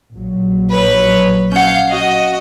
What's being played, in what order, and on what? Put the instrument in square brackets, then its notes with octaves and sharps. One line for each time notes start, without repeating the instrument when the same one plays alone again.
[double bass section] A#1 F#3
[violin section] B4 C#5
[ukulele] C#4 F#5 [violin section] F5 G6
[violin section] F#4 D#5